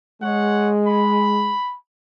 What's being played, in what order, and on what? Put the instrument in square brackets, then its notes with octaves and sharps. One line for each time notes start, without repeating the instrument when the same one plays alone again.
[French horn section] G#3 [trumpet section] C#5 F#5
[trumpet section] B5